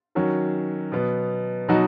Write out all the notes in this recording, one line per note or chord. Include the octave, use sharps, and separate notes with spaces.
D#3 F#3 C#4 F#4
B2 F#3 B3
B2 F#3 D#4 F#4